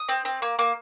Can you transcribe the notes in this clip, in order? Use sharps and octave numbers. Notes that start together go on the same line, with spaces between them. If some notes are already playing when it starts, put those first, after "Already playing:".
Already playing: D#6
C4
C4
A#3
A#3